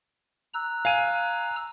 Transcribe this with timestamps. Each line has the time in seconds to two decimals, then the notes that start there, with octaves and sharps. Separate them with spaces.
0.54 A#5 E6 F#6
0.85 F5 G#5 D#7